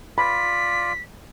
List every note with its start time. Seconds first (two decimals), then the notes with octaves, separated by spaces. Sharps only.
0.18 F4 D5 B5 B6